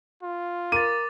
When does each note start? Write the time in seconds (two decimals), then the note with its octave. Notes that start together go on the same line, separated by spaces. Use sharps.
0.23 F4
0.72 A#4 D6 A6 D#7